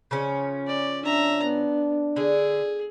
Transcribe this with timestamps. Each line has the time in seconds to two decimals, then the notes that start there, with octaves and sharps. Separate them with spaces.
0.11 C#3 F3 C#4
0.67 D5
1.05 D4 E5 A#5
1.44 B3
2.16 D3 G#4